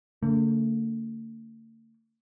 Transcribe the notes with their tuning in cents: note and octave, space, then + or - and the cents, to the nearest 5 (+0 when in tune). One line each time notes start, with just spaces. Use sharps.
D3 -35 A3 +45